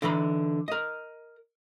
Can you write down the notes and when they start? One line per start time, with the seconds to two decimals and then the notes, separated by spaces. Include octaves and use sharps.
0.02 D3 E3 A#5 B5
0.68 A#4 D#5